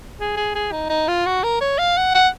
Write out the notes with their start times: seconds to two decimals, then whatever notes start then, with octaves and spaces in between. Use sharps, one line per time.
0.20 G#4
0.37 G#4
0.55 G#4
0.72 D#4
0.90 D#4
1.08 F4
1.26 F#4
1.44 A#4
1.61 C#5
1.79 F5
1.97 F#5
2.15 F#5